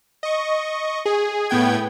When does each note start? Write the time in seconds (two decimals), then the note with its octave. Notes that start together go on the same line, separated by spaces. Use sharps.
0.23 D#5 C#6
1.06 G#4
1.49 A2 B3 G5 G#6